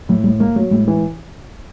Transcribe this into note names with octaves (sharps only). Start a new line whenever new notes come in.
A2 F#3
A2 G3
G#3 A#3
F#3 A3
A2 G#3
E3